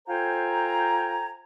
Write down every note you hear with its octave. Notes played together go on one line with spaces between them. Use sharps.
F4 A4 C5 G5 G#5 A#5